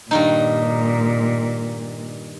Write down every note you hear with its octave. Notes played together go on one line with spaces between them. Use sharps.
G2 A#2 D#3 D#4